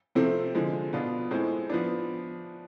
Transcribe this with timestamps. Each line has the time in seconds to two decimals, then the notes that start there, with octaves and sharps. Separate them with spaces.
0.15 C3 F3 A3 C4
0.55 D3 F3 G#3
0.93 B2 B3 D4 F4
1.31 A2 G#3 C4
1.70 F3 B3 D4